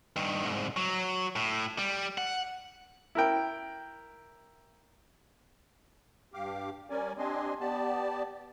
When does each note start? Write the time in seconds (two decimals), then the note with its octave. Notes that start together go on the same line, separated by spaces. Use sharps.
0.16 G2 D#3
0.44 C2 G#2
0.76 F#3
1.36 A2
1.78 G3
2.18 F#5
3.15 E4 A#4 G5
6.34 G2 G4 F5 D6
6.90 G3 C#4 A#4 D5 G#5
7.18 C4 D4 G4 D#5 G#5 C6
7.60 B3 G4 D5 A5